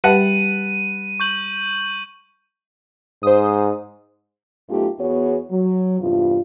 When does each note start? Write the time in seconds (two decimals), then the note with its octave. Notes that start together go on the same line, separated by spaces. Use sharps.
0.04 G3 G4 B4 E5 F#5 A5 D#7
1.20 C#6 G6 F#7
3.23 G#2 C5 D#6
4.69 F#2 A3 B3 D#4 F4 G4
5.00 E2 B3 F#4 G#4 C#5
5.51 F#3
6.00 E2 G2 C3 F4